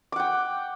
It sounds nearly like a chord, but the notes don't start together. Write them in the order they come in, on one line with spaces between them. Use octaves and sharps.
D6 F#5 G5